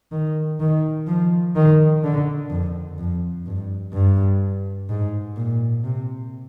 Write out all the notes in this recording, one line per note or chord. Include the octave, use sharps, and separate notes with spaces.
D#3
D#3
F3
D#3
D3
F2
F2
G2
G2
G#2
A#2
C3